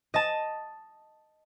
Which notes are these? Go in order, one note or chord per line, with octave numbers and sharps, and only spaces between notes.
D#5 A5